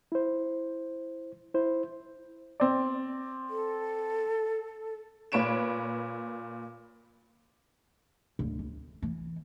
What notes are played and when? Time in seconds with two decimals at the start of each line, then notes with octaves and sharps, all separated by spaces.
0.12 E4 C5
1.54 E4 C5
2.60 C4 D5
3.50 A4
5.32 A#2 B4 C#5 D7 E7
8.39 D1
8.59 D2
9.02 E3